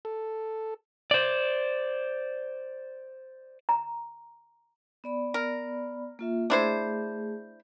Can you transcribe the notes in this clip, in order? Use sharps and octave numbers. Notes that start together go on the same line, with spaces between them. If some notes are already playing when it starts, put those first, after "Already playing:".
A4
C5 D5
A#5
B3 D5 B5
A#4
A#3 F4 E5
A3 D4 E4 G#4 C5